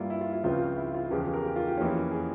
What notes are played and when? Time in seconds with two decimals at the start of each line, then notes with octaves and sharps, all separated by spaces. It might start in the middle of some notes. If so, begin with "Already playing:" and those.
Already playing: G2 G3 A#3 E4 F4
0.10 E4
0.21 F4
0.33 E4
0.44 C#2 C#3 F3 C4 F4
0.77 E4
0.94 F4
1.11 E2 C#3 F3 G#3 G4
1.22 G#4
1.34 A#4
1.45 G4
1.56 F4
1.67 G4
1.78 F2 E3 A#3 C#4
2.11 G#4